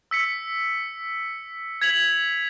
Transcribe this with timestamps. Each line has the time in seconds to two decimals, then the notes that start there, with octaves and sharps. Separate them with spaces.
0.11 E6 B6 C#7
1.82 G#6 B6 F7 F#7